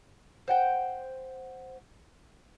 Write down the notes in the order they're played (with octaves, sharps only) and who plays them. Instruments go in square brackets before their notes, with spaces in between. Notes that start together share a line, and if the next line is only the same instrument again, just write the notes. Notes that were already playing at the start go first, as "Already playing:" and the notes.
[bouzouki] C5 F#5 G5